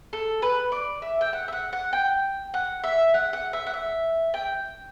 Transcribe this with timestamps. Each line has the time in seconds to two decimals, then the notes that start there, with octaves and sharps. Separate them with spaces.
0.13 A4
0.42 B4
0.72 D5
1.02 E5
1.21 G5
1.33 F#5
1.48 E5
1.53 F#5
1.73 F#5
1.93 G5
2.54 F#5
2.83 E5
3.14 F#5
3.33 F#5
3.53 E5
3.67 F#5
3.74 E5
4.34 G5